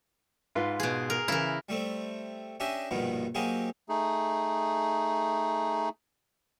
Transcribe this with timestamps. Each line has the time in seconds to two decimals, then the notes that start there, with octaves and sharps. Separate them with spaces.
0.55 G#2 F4 B4
0.80 B2 G#4
1.10 A#4
1.28 C#3 E3 E4 A#4
1.69 G3 A3 C4
2.60 C#4 D4 G4 D#5 E5
2.91 A#1 G2 B2 D#3 B3
3.35 F#3 A#3 C4 D#4 G4 G#4
3.89 A3 D#4 G#4